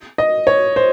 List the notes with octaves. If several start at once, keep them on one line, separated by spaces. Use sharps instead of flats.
D#5
C#5
C5